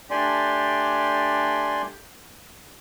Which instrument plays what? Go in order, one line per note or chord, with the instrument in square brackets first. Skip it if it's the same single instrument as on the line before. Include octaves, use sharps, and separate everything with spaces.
[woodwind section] A3 D4 G4 [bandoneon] D5 G#5 C6